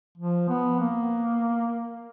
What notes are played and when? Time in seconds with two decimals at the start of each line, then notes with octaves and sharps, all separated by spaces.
0.18 F3
0.49 B3
0.79 A#3